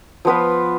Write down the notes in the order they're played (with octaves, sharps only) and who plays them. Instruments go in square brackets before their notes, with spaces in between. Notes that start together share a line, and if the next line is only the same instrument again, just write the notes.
[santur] F3 B3 F4 B4